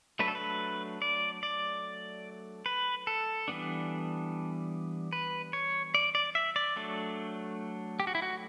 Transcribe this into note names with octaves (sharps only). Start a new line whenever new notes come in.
F#3 A3 D4 B4
A4
B4
D5
D5
B4
A4
E3 G3 B3 D4
B4
C#5
D5
D5
E5
D5
F#3 A3 D4
G4
F#4
E4
F#4